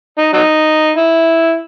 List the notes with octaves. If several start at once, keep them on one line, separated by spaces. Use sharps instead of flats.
D#4
F#3 D#4
E4